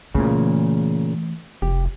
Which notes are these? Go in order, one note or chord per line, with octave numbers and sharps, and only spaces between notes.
A#2 C#3 E3 A3
F1 G4